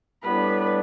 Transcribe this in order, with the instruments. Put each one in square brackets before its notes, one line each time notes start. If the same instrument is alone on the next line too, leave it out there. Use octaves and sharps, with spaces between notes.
[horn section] A2 G3 B3 D4 [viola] B4